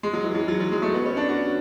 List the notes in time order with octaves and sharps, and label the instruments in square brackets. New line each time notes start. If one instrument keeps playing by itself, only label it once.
[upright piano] G#3
F#3
E3
F#3
F#3
F#3
G#3
A3
B3
C#4
D4
F#4